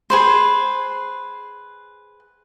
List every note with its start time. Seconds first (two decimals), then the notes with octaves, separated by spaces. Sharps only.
0.10 G#4 B4 C5